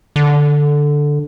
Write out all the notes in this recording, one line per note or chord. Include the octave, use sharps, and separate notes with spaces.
D3